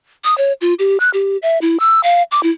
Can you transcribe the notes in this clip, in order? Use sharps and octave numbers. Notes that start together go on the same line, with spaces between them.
D#6
C#5
F4
G4
F#6
G4
E5
E4
E6
F5
D6
E4